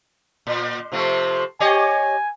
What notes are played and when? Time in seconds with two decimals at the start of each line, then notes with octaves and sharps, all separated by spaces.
0.47 A#2
0.92 C3 F3 A3
1.60 G4 C#5 D#5 G#5